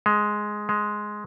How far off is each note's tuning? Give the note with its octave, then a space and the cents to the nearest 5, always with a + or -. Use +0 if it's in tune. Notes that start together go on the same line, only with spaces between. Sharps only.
G#3 +5
G#3 +5